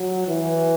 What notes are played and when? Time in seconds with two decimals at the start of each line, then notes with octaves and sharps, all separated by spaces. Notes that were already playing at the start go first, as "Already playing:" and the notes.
Already playing: F#3
0.28 E3